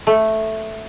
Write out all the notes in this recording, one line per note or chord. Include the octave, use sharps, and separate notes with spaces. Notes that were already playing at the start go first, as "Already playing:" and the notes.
A3